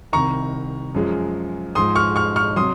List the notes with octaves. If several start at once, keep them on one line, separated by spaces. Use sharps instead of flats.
C2 C3 D#3 A#5 C#6
F#2 F3 G#3
G#2 F3 G#3 C6 D#6
C#6 F6
C#6 F6
C#6 F6
C3 F#3 C6 D#6